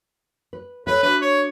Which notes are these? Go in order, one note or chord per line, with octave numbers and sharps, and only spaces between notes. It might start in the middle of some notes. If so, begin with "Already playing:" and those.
B4
A4 B4 C#5 E5
D4 F#4 B4
C#5